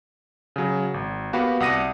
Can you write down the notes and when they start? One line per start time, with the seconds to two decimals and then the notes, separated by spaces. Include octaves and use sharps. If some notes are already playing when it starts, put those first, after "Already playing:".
0.56 C#3 F#3
0.94 G#1
1.33 A#3 B3 F#4 G4 B4 F5
1.60 C2 F#5 D#6 A#6 D#7